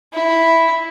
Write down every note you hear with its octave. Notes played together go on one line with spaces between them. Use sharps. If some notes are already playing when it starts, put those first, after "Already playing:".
E4